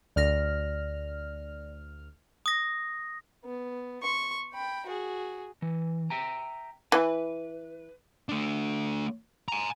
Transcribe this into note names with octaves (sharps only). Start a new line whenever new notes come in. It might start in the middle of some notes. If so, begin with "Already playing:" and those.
D2 D5 F6 A#6
D#6 A#6
B3
C6 C#6
G5 B5
F#4 G#4
E3
E5 G5 A#5
E3 B4
A3 D4
G#5 A#5